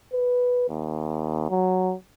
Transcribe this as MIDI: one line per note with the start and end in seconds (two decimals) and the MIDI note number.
0.13 0.68 71
0.69 1.50 39
1.50 1.93 54